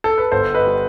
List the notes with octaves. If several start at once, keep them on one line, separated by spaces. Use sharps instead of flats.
A4
B4
G1 A4 C5
B4 D#5
G3